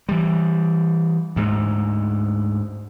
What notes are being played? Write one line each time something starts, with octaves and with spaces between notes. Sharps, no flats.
E3 G3
D2 G#2